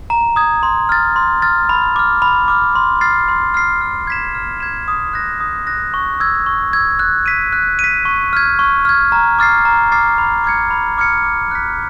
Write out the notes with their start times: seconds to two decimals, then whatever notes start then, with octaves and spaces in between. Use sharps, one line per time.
0.10 A#5
0.36 D#6 G#6
0.63 C6
0.89 F6 A6
1.16 C6
1.42 F6 A6
1.69 B5
1.96 D6 F6
2.22 B5
2.48 D6 F6
2.76 C6
3.01 F6 A6 C7
3.28 C6
3.54 F6 A6 C7
3.81 F6
4.07 G#6 B6 E7
4.35 F6
4.60 G#6 B6 E7
4.88 D#6
5.14 F#6 A#6
5.41 D#6
5.67 F#6 A#6
5.94 C#6
6.20 E6 G#6
6.46 C#6
6.73 E6 G#6
6.99 F#6
7.26 B6 D#7
7.53 F#6
7.79 B6 D#7
8.05 C#6
8.33 F6 G#6
8.59 C#6
8.85 F6 G#6
9.12 A#5
9.39 D6 F6 A6 C7
9.65 A#5
9.92 D6 F6 A6 C7
10.18 B5
10.44 D6 F6 G#6 C#7
10.71 B5
10.98 D6 F6 G#6 C#7
11.24 D6
11.51 F#6 B6